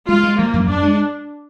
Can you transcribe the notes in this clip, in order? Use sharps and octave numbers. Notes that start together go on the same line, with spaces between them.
G#3 F4
G#3
F3 A#3
F#2
F#2 D4
G#3